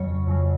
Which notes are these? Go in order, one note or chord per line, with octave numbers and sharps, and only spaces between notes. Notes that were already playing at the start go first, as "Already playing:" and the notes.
Already playing: F2 C#3 F#3 C#5
F2 C#3 F#3